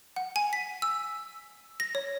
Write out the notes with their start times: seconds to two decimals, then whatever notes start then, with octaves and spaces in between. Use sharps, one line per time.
0.16 F#5
0.36 G#5
0.53 B6
0.82 E6
1.80 A#6
1.95 C#5